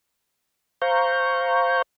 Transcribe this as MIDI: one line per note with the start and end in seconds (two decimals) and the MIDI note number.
0.82 1.82 72
0.82 1.82 77
0.82 1.82 82
0.82 1.82 85
0.82 1.82 91